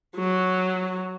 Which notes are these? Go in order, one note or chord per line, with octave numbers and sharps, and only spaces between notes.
F#3